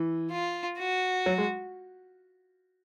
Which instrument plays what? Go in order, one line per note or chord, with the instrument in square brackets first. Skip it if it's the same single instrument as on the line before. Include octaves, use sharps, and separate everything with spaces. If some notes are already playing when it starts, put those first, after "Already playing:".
Already playing: [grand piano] E3
[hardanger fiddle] F4
F#4
[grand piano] F#3
G#3